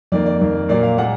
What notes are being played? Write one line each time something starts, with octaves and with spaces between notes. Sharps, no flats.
F2 D#3 A#3 D5
D5
F2 D#3 A#3
A#2 F#3 A#3 D5
F5
A#2 G#3 F#5